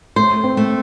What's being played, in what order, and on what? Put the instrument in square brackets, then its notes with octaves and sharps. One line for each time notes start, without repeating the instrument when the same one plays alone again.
[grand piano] A3 [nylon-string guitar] C5
[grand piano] C4
[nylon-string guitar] A3